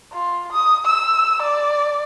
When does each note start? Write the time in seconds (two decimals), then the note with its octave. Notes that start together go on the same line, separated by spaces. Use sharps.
0.13 F4
0.53 D#6
0.86 E6
1.42 D5